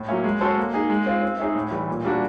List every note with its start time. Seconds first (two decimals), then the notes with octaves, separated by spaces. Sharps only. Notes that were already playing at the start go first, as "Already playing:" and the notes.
Already playing: A2
0.08 F#3 A#3 C#4 E4
0.24 G#3
0.41 C#4 F#4 A4 C5
0.57 A#3
0.74 D#4 G#4
0.90 G#3
1.06 C4 F4
1.22 C4
1.39 D#4 G#4 C#5 E5
1.55 A2
1.71 E3 G3
1.88 A#2
2.05 G3 A#3 D4 F#4